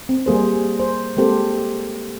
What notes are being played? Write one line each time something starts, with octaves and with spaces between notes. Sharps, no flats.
C4
G3 A#3 G#4 C5
C5
G#3 A#3 C4 G4 A4 C5